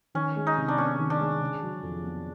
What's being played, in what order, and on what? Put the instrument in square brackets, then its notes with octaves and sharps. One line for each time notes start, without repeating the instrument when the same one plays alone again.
[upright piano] D#3 [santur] C#4
[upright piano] G#3
[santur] D#4
[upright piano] C3
[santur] D4
[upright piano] B3 [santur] C#4
[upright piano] D#3
[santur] D4
[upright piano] G#3
C#3
F#3
F2
B3